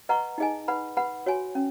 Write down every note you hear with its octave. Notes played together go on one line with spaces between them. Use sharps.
B4 D#5 F#5 A#5 C#6
D#4 G#4 D#5 G#5
B4 F#5 B5
B4 F#5 B5
F#4 C#5 G#5
C#4